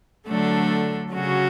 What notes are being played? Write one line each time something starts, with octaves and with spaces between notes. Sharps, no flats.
D3 F#3 A3 D4 A4
C#3 F#3 C#4 F#4